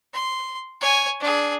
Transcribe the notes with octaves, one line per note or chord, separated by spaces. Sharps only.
C6
C#5 G#5
D4 G#4